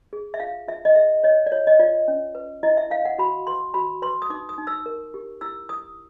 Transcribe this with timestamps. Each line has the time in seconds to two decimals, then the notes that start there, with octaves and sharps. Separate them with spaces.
0.13 G#4
0.34 E5
0.40 F4 F5
0.68 F4 E5
0.85 D#5
0.95 G#4 E5
1.23 C#5 D#5
1.46 D5
1.52 F4 C#5
1.67 D#5
1.80 F4 D5
2.08 C#4
2.35 B4
2.63 E4 D#5
2.77 E5
2.90 E4 F5
3.05 F#5
3.18 F#4 B5
3.47 B4 C6
3.74 F#4 B5
4.02 B4 C6
4.22 D#6
4.30 D#4 D6
4.49 D#6
4.58 D#4
4.67 E6
4.86 A#4
5.14 G4
5.41 E4 E6
5.69 E4 D#6